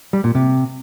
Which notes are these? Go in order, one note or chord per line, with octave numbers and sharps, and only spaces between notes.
G3
A#2
C3